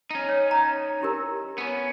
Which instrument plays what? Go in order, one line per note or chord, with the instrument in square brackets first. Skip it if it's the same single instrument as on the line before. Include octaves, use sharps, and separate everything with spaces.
[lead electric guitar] C#4 D#4
[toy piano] C#5
A#5
E4 G4 A#4
[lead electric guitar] B3 C#4